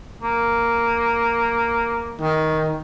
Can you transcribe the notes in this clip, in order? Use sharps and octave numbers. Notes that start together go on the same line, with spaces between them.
A#3
D#3